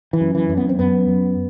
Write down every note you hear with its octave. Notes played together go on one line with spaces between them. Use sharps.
E3
F#2
E3
F#2
B3
C4
F#2 B3
F#2